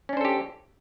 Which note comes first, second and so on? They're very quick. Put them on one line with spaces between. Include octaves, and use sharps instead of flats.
C#4 D4 C5 A4 G4